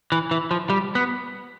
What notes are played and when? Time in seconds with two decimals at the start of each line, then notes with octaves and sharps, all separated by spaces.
0.12 E3
0.31 E3
0.51 F3
0.70 G3
0.95 B3